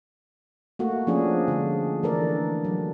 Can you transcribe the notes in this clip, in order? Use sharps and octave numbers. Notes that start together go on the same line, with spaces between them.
A3 A#3 F#4
F3 A3 C#4 D4 G#4
D3 G#3
E3 A3 D4 A4 A#4 D5
F#3